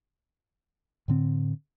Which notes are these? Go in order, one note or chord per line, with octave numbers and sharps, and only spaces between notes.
A2 D3 C4